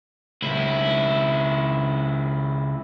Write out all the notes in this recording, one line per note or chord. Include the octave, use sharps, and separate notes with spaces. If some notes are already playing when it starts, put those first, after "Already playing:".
C#2 E4